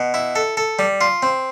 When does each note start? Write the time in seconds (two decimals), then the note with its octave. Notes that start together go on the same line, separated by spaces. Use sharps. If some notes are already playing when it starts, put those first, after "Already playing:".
Already playing: B2
0.14 E4
0.36 A4
0.57 A4
0.79 G3
1.01 F4
1.23 C4